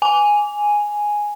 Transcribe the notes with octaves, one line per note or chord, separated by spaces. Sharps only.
G#5